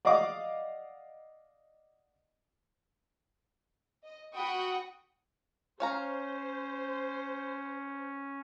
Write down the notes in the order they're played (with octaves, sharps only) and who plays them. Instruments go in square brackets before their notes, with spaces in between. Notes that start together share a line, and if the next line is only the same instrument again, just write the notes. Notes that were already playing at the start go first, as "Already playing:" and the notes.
[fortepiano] D5 D#5 F5 F#5 D6 D#6
[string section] D#5
F#4 F#5 G5 B5 C#6 D#6
[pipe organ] C#4 [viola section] C5 [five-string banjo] C#5 F5 A#5